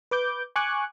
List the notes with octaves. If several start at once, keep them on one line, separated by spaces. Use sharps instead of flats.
B4 D6 G6
G#5 C#6 D6 F#6